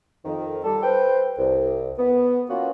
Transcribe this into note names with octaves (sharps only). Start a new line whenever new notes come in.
F2 D#3
G3 A4
B4 C5 G5
C2
B3
E3 A#3 B3 C#4 F4 F#4